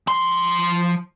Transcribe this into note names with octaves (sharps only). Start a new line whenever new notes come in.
F3 C6